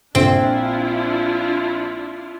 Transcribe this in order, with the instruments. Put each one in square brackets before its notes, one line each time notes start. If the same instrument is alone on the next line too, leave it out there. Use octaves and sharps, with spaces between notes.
[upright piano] A#1 [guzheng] C4 [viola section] D4 E4 F4